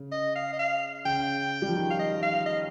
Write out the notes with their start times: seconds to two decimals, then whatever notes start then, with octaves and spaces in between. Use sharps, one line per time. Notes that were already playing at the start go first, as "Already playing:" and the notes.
Already playing: C#3
0.12 D#5
0.35 F5
0.53 D#5
0.59 F5
1.05 C#3 G5
1.62 G3
1.69 F3
1.75 D#3
1.90 F5
1.99 D#5
2.23 F5
2.46 D#5